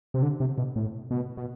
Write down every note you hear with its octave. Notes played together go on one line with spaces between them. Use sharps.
C3
D3
C3
B2
A2
B2
B2